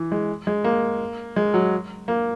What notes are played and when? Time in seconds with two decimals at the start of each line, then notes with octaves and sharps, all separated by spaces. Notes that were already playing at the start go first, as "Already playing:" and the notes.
Already playing: E3
0.12 G#3
0.47 G#3
0.64 A#3
1.36 G#3
1.54 F#3
2.08 A#3